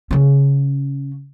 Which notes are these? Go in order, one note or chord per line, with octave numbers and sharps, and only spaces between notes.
C#3 C#4